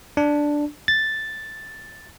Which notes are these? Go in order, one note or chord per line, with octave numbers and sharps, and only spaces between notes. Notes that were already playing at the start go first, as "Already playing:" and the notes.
D4
A6